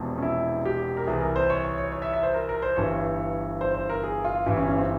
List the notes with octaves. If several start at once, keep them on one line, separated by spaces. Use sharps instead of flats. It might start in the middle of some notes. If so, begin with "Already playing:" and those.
Already playing: E1 E2 C3 F3
C#4
E4
G4
A#4
C2 C3 E3 G#4
A#4
C5
C#5
C#5
C#5
C#5
E5
E5
C5
A#4
A#4
C5
G1 G2 E3 C#5
C5
C5
A#4
G#4
F4
G1 G2 E3 E4
C#4
C#4
C4